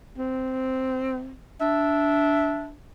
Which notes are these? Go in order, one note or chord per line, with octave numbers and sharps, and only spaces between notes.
C4
D4 E5